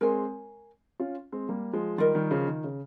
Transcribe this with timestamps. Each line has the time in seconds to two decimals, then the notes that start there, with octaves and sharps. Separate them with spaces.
0.01 G#3 C4 A#4 C#5 G#5
1.00 C#4 F4
1.32 G#3 C4
1.49 G3 A#3
1.73 F3 G#3
1.98 D#3 G3 F4 A#4 D#5
2.15 D#3 G3
2.31 C#3 F3
2.47 D#3
2.64 C#3